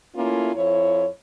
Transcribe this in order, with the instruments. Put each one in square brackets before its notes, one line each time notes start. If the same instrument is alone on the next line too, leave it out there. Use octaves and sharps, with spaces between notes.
[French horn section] A3 A#3 C#4 E4 F4
F2 E4 C#5